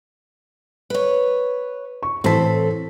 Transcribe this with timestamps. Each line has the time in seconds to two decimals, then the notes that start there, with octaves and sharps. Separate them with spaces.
0.90 B4 C#5
2.03 C#6
2.24 A2 E3 C4 A4 B6